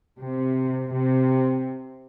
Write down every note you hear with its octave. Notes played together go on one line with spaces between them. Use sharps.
C3
C3